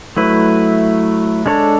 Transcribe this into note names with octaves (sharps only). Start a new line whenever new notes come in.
F#3 A3 E4 B4
G#3 D4 A4 C#5